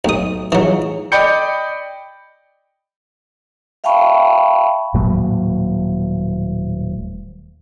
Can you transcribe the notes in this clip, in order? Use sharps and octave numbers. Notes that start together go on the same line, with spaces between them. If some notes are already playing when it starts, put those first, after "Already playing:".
B1 F#3 A3 D#4 D#6
E3 F#3 D#4 F4 G#4
D5 D#5 G5 B5 G6 C#7
E5 F5 G5 A5 B5 C#6
D#1 A2 F#3 A#3